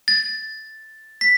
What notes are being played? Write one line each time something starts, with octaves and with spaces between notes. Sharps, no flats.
A6
B6